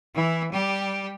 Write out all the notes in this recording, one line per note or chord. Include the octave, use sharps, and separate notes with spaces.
E3 E4
G3 G4